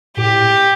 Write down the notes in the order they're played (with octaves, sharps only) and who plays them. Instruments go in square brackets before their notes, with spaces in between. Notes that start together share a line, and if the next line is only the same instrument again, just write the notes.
[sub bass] A2 [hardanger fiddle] G4